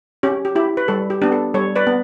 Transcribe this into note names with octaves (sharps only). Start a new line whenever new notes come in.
C#4 G4
G4
E4 G4
B4
G3 A4
G4
B3 D4 G4
A4
G3 A4 C#5
B4 D5
B3